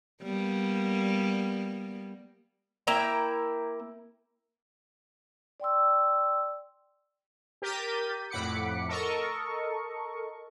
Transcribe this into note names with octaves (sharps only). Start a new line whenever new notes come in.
G3 A#3 B3
A#3 E4 G5 A#5
D5 G5 C6 E6
G4 A#4 G6 A6 B6 D#7
F2 A2 F#5 B5 D6 C#7
A4 A#4 D#5 C#6